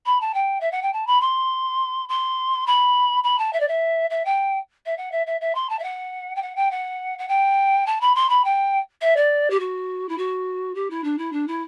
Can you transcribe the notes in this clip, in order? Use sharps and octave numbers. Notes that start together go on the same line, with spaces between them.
B5
A5
G5
E5
F#5
G5
A5
B5
C6
C6
B5
B5
A5
E5
D5
E5
E5
G5
E5
F#5
E5
E5
E5
C6
A5
E5
F#5
G5
F#5
G5
F#5
F#5
G5
A5
B5
C6
B5
G5
E5
D5
G4
F#4
E4
F#4
G4
E4
D4
E4
D4
E4